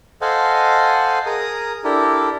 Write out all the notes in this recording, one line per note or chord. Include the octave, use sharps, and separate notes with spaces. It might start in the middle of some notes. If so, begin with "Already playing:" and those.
A4 C5 D#5 F5 F#5 G#5
G#4 A#4 A#5 D#6
D4 E4 G4 A4 A#4